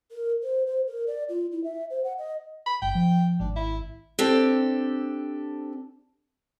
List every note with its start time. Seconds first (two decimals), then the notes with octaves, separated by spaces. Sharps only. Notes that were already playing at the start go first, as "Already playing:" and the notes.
0.12 A#4
0.43 C5
0.66 C5
0.87 A#4
1.07 D5
1.29 F4
1.52 E4
1.64 E5
1.90 C5
2.04 F#5
2.18 D#5
2.66 B5
2.82 G1 G5
2.95 F3
3.39 G#1 D4
3.56 E4
4.19 C4 D4 G4 A4